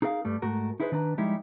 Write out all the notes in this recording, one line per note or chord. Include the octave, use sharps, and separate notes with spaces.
D#4 G#4 A#4 D#5 F5
G2 G3 A3
G#2 A3 F#4 A#4
D#4 E4 G#4 A4 B4 C5
D#3 D4 B4 A#5
F3 G3 G#3 D#4 E4 G4